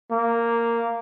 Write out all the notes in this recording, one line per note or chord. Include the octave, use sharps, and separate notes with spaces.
A#3